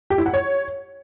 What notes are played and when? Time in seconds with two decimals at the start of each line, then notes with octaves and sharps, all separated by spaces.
0.10 G4
0.18 E4
0.26 F#5
0.34 C#5